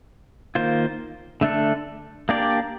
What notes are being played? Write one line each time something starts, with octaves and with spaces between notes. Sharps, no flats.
D#3 A#3 F4 C5
D3 A3 D4 A4
A#3 D4 G4 D5